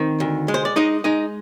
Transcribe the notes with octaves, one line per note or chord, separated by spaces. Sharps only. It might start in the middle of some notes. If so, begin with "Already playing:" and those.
Already playing: D#3 C4
D2
G#3
C5
D5
G#3 D#4 D#5
G#3 D#4 D#5